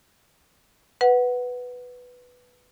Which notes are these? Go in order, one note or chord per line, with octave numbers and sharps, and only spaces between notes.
B4 F#5